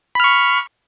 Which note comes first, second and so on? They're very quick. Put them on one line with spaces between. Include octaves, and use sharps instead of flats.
B5 F6 C#6